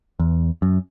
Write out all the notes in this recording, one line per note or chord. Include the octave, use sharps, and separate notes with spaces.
E2
F#2